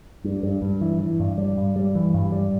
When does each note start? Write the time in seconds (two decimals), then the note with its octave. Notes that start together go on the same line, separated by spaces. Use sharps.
0.24 G2
0.43 G2
0.62 G2
0.81 E3
1.00 E3
1.20 G2
1.38 G3
1.58 G2
1.76 G3
1.95 E3
2.14 G2
2.32 G3